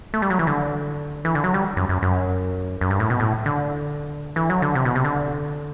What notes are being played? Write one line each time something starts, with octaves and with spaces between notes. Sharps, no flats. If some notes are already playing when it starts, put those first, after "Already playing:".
A3
G3
F#3
E3
D3
E3
D3
F#3
G3
F#2
F#2
F#2
F#2
G2
A2
B2
A2
D3
E3
F#3
D3
C3
B2
C3
D3